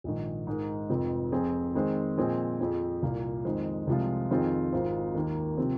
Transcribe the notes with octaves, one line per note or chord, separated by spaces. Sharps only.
A#1 G#2 D#3
G#2 G#3 D#4 A#4
F1 F2 F3 C4
F2 F3 C4 G#4
D#3 G#3 C4 G#4 C5
A#2 F3 C4 G#4 D#5
F2 F3 C4 G#4
C2 A#2 A#3 F4
F2 D#3 G#3 D#4 C5
C2 C3 F3 G#3 F4
F2 D#3 C4 F4 G#4
G#1 G#2 G#3 F4 C5
D#2 D#3 A#3
C3 F3 C4